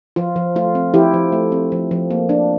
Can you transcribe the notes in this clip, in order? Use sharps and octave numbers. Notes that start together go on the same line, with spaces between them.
F3 F4
F3
A3 F4
C4
F3 E4 G4
F3
A3
C4
F3
F3
A#3
D4